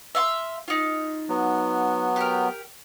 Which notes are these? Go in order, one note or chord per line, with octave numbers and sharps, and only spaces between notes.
E5 F5 C6
D#4 F4
F#3 B3
G4 A#4